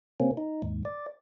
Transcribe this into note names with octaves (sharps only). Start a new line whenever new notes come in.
C3 A#3 C4 C#4
D#4
D#2 G#2
D5